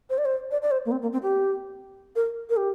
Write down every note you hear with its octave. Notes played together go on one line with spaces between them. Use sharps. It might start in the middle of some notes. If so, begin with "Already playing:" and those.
C5
D5
C5
D5
D5
C5
A#3
C4
A#3
C4
G4
A#4
A#4
G4